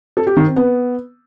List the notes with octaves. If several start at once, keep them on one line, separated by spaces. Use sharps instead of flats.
A4
G4
D#3
C4
B3